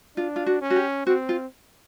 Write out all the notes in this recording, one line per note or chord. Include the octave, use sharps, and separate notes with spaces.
D4 F4
F4
F#4
C#4
F#4
G4
C4 F#4
F4